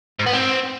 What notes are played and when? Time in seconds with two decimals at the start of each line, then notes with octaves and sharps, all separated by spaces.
0.19 G#2
0.26 B3
0.33 C4